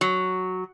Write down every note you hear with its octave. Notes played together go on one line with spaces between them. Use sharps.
F#3